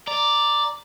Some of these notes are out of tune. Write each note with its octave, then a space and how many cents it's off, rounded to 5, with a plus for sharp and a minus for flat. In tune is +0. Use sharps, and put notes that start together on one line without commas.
D5 +0 A#5 +0